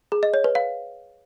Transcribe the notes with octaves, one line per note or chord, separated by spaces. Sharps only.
G#4
D#5
C#5
B4
F5